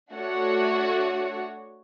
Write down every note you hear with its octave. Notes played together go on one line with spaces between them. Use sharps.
A3 D4 F#4 C#5 F#5